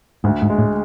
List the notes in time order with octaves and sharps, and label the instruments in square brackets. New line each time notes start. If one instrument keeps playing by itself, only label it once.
[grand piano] D2 [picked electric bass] G#2
[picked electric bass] G#2
[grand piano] G#3
[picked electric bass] A2